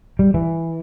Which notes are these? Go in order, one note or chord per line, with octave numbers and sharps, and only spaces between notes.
G3
E3